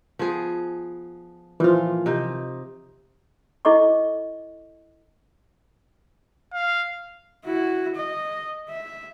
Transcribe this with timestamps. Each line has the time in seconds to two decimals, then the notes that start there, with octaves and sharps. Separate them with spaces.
0.19 F3 B3 G#4
1.60 A#2 E3 F3 F4
2.06 C3 D#4
3.65 E4 A4 D#5 C#6 D6
6.54 F5
7.45 E4 F#4
7.95 D#5
8.69 E5